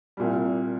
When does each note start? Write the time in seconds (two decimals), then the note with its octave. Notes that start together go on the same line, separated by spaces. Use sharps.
0.17 C2 A#2 G3